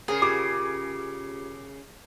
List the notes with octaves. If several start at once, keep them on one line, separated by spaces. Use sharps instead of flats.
C#3 G#4 A#4
F4 G4 D6 G#6